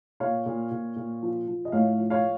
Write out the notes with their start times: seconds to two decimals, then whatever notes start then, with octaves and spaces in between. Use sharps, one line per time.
0.20 A#2 C#5 F5
0.46 A#2
0.71 A#2
0.96 A#2
1.23 F3
1.48 F3
1.65 D#5
1.72 A2 C#5 F5
1.98 F3
2.10 C#5 F5